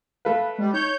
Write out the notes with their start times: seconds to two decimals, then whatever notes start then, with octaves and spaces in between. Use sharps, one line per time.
0.25 A3 B4 F5
0.58 G3 G#3
0.74 D#4 C#5 G6